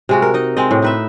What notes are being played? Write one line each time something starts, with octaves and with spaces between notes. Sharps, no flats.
C3 G#3 F#4
A#4
D#4 D#5
G#3 C4 D#5
A2
D#4 B4 E5